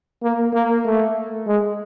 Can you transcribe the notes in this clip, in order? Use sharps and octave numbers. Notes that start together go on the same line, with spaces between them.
A#3
A#3
A3
G#3